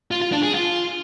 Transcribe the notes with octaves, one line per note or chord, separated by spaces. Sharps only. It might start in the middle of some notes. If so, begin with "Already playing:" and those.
F4
F4
D4
G#4
F4